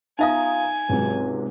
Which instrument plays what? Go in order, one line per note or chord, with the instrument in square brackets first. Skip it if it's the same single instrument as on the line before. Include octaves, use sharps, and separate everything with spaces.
[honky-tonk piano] B3 A#5 D#6 [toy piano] D#4 E5 F5 [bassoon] F4 [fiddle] G#5
[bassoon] C#2 [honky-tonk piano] G#2 C3 F#3